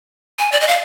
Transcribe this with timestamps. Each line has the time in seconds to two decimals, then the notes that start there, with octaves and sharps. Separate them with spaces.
0.39 G#5
0.52 D5
0.61 D#5
0.68 F5